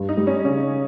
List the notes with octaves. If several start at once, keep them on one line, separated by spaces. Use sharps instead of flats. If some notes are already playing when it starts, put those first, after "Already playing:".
Already playing: G2
D#4
G3
C#4
C#3 C#4